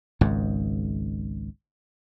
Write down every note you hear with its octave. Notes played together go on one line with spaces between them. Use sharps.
G#1 C#2 G#2